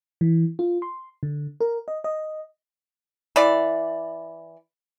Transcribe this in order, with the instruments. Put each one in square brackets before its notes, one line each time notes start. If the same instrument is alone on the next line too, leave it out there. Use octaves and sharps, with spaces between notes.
[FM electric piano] E3
F4
C6
D3
A#4
D#5
D#5
[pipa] E3 D5